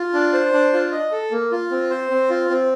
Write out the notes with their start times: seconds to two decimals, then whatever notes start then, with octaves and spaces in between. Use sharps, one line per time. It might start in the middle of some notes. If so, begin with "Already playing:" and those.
Already playing: F4
0.14 D4
0.33 C5
0.53 D4
0.73 F4
0.92 D#5
1.12 A4
1.31 A#3
1.52 F4
1.71 C4
1.90 C5
2.11 C4
2.30 F4
2.50 C4